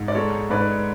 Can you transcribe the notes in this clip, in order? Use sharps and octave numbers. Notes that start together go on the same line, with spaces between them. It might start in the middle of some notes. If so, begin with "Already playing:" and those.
Already playing: G#2
D5
G#3 A4 C#5
G#2 B4 D5